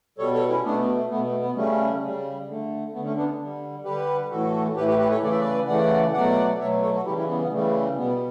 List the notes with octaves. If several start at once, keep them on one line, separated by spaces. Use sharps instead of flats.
B2 G3 A4 C#5
A4 C#5
C#4 E4
B2 A3 B3 D4
A3
B2 A3 B3
A3
B3
C#3 G3 A3 C#4
C#3 G3
D3 A3
A3 B3
D3
A3 C#4
B3 D4
D3 G3
D3 G3 G4 B4
A2 E3 A3 F#4 A4
A2 E3 A3 G4 B4
G4 B4
G4 B4
A4 C#5
C#3 E3 A3 D5
E5
B4 D5
C#3 E3 A3 D5 F#5
B2 F#3 A3 D5 F#5
B2 F#3 A3 C#5 E5
A4 C#5
F#4 A4
C#3 E3 G3 E4 G4
C#4 E4
B3
B3
C#3 E3 G3 A3
B2 G3 B3